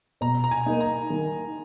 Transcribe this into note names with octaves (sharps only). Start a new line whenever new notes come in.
B2 A#5
A#5
G#5
A#3 D#4
A#5
D#3